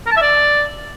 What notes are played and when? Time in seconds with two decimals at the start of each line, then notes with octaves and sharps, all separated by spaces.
0.06 A#4
0.11 A5
0.17 E5
0.22 D5